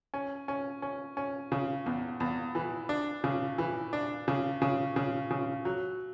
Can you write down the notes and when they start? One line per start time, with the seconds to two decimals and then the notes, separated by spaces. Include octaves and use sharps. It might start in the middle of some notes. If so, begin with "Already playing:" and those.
0.14 C#4
0.48 C#4
0.82 C#4
1.17 C#4
1.52 C#3
1.86 E2
2.20 E2
2.55 E3
2.89 D4
3.24 C#3
3.58 E3
3.93 D4
4.28 C#3
4.62 C#3
4.96 C#3
5.30 C#3
5.65 F#3